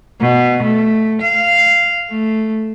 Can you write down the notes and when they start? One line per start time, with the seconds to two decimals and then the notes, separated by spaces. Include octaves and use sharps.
0.19 B2
0.62 A3
1.21 F5
2.09 A3